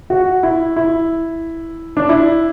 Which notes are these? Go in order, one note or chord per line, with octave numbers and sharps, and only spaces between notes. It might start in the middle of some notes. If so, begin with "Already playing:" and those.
F#4
E4
E4
D4
E4